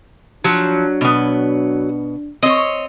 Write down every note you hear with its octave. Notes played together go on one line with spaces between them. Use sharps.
F3 F#3 D4
B2 B3
C4 C#5 D#5